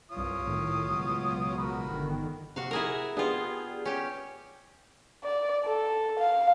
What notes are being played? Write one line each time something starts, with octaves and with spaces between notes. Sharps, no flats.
C2 G2 F4 C#5 D#6
C2 A2 D#3
C#2 B2 F#3
F#4 A#4 B5
G1 D3 D#3
C3 F#4 F5
E4 G#4 A#4
B3 D4 F4 G4 G#4
C#4 G4
D5
A4
F5